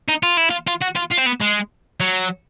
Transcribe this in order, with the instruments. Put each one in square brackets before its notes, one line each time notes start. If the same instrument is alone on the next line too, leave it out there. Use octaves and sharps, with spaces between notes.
[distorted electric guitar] D#4
F4
E4
F4
F4
F#4
F4
F4
C4
B3
G#3
F#3